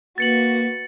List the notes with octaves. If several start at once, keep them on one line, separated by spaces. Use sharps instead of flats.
A#3 F#4 B4 A6 C#7 F#7